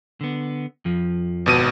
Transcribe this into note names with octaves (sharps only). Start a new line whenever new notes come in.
D3 B3
F2 F3
G#1 B2 D#7